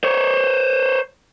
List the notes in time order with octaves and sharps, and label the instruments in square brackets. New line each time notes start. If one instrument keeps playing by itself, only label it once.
[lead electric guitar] C5 C#5